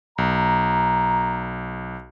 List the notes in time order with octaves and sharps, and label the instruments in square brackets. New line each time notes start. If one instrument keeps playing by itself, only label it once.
[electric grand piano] B1 [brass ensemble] A#5